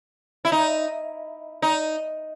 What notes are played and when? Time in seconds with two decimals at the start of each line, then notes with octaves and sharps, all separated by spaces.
0.45 E4
0.52 D#4
1.62 D#4